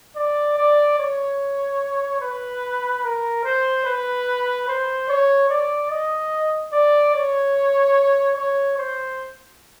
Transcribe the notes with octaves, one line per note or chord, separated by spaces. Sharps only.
D5
D5
C#5
B4
A#4
C5
B4
C5
C#5
D5
D#5
D5
C#5
C#5
C5